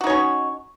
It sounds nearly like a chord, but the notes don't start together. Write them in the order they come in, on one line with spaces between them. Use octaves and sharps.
F#4 D#4 C#5 C#4